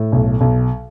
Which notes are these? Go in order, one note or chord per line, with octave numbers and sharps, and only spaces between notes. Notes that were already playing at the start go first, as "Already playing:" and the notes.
Already playing: A2
B1
B1